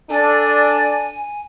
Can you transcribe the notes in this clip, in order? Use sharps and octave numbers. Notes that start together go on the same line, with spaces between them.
D4 A4 D5 G#5